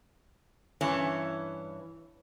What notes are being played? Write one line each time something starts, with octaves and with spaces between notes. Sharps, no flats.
G2 E3 C#4